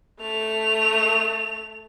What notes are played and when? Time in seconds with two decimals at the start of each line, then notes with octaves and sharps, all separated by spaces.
0.20 A3 F7